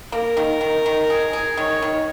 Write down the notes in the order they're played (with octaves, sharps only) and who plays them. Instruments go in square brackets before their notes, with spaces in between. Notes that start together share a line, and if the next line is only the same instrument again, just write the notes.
[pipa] A#3 [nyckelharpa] A#4
[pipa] D#3
D#3
D#3
G#4
G#4
[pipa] D#3 [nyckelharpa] C#5
[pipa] D#3